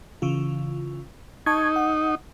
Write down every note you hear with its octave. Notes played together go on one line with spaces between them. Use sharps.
C#3 E3 F4
D#4 A5 C#6 G#6
F#5